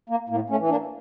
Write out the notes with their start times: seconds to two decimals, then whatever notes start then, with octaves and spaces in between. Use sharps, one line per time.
0.10 A#3
0.29 A2 A#3
0.50 A3 C#4
0.59 E3
0.70 A#3 D4